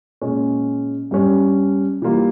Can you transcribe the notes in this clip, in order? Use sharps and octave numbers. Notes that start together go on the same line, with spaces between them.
A#2 G#3 C#4
G2 G3 C#4
E3 G3 A#3 F4